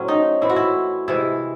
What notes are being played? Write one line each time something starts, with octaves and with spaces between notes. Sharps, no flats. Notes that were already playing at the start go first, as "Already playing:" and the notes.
Already playing: A2 F#3 C4 C#4
D#4
A2 E3 C4 E4
F#4
E4
C3 E3 G#3 E4